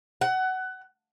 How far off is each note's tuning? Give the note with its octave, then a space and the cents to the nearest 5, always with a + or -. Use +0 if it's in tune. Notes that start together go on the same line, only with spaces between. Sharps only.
F#5 +20